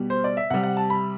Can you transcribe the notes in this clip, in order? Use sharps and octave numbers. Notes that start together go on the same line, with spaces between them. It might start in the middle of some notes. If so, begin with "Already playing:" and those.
Already playing: B2 G3
C5
D5
E5
C3 G3 F#5
F#5
A5
B5